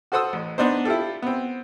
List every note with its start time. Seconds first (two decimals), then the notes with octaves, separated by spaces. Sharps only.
0.12 F#4 A4 C5 F#5 D#6 E6
0.33 A1
0.58 B3 D4 D#4 C5
0.85 E4 F4 G4 A4
1.23 B3 C4